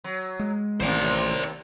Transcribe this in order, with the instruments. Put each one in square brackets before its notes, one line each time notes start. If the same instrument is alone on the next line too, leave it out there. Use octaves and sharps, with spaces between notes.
[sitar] F#3
[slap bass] G#3
[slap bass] A1 [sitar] D#2 C3 [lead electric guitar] C5 D5